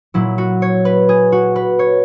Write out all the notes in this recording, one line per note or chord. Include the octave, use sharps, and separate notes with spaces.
A#2 F#3 E4
F#4
C#5
B4
G#4
F#4
B4
C#5